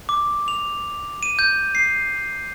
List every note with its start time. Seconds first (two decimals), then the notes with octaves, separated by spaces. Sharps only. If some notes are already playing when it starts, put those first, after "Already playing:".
0.09 D6
0.48 F7
1.23 D#7
1.39 G6
1.75 C7